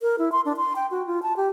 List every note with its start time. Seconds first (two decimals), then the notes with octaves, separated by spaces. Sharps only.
0.01 A#4
0.18 E4
0.32 C6
0.45 D4
0.57 C6
0.76 G5
0.91 F#4
1.06 F4
1.23 A5
1.37 G4